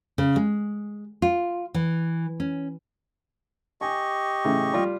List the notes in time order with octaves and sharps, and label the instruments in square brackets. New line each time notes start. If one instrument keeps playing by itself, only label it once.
[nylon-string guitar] C#3
G#3
F4
E3
C#4
[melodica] G4 D#5 C#6 [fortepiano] G#5
[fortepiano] A2 C#3 E3
G3 F4